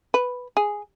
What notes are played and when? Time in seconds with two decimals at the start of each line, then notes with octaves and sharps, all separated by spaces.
0.14 B4
0.57 G#4